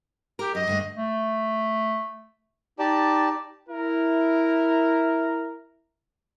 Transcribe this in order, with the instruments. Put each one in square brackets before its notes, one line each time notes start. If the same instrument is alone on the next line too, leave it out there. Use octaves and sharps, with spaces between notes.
[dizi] G4 [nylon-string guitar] A#4
[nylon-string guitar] F#2 [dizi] D#5
[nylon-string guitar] G2 D3 A3
[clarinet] A3
[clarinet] D#4 [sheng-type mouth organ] G4 D5 A5
[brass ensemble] E4 A#4